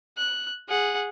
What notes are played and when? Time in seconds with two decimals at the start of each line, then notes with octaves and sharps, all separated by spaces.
0.17 F#6
0.69 G#4 F#5